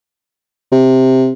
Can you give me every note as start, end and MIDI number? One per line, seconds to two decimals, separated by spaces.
0.72 1.32 48